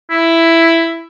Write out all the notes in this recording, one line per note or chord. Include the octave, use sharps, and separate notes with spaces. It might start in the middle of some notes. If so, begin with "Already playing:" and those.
E4